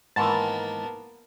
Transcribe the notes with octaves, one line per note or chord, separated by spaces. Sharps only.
G#2 D#3 E3 A#3 B3 A5